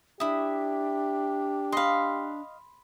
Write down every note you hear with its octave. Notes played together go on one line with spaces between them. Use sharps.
D4 E4 G4 E5 D#6
D#5 F5 B5 C6